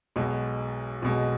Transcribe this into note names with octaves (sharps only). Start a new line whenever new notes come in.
B1 B2 G#3
B1 B2 G#3